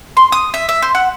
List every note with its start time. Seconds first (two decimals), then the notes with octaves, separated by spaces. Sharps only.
0.17 C6
0.32 D#6
0.54 E5
0.69 E5
0.82 C5
0.95 F#5